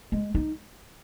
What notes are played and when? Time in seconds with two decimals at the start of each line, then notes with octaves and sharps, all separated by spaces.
0.12 G#3
0.34 D#4